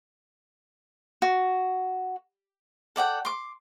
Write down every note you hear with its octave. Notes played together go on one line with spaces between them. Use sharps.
F#4
A4 D5 F#5 G5
C6 D6